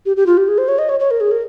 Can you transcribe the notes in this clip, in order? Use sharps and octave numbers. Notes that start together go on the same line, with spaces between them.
G4
G4
F4
G4
G#4
C5
C#5
D#5
C#5
C#5
A#4
G#4
A#4